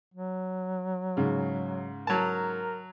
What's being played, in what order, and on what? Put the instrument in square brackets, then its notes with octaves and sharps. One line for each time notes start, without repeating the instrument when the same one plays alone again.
[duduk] F#3
[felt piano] G#2 C#3 G#3
[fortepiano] F#3 A5 [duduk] A#4